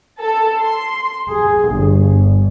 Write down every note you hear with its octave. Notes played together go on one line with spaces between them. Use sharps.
A4
C6
G#4
G1